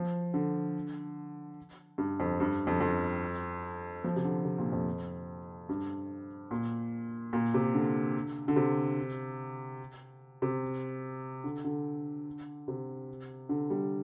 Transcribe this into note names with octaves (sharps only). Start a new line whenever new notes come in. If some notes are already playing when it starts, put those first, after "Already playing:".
Already playing: F3
D3
G2
F2
G2
F2
F2
F3
C3
D3
C3
A#2
F2
G2
A#2
A#2
C3
D3
D3
C3
C3
D3
D3
C3
D3
G3